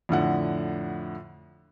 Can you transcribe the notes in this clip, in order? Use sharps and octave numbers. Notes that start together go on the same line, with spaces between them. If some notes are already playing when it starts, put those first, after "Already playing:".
F2 A2 D3 F#5